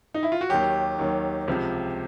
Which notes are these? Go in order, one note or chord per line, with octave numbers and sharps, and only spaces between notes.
D#4
E4
F4
F#4
D#2 D#3 F#3 G4
D#2 D#3 F#3
C#2 C3 F3